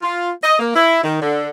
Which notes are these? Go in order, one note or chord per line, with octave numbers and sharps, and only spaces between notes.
F4
D#5
A#3
E4
D#3
D3